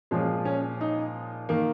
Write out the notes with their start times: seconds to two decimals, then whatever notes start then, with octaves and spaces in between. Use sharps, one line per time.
0.11 A#2 F3 G#3 C#4
0.45 C#4
0.81 D#4
1.49 D#3 A#3